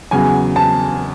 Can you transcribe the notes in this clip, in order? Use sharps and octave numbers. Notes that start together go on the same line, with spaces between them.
E2 C#3 F#3 G#5
A5